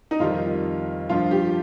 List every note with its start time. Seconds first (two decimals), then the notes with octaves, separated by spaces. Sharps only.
0.11 D#4
0.19 F2 D#3 G3 F4
1.09 G2 F3 F4
1.31 G4